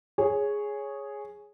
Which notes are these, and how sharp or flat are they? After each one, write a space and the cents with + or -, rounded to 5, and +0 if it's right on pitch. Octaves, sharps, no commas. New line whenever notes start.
G#4 +0 C#5 +0